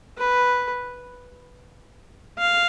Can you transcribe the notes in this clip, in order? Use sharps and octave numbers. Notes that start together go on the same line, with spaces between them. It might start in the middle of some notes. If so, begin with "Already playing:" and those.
B4
F5